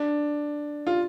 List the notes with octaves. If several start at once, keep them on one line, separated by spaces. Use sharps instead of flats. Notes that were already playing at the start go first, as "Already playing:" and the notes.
Already playing: D4
F4